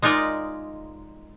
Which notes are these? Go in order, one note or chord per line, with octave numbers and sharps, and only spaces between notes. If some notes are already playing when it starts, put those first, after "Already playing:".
G#3 D#4 F4 A#4 D5